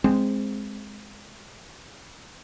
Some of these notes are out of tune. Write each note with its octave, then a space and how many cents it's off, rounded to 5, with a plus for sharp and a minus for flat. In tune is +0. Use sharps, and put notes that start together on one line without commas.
G#3 +0 C4 +0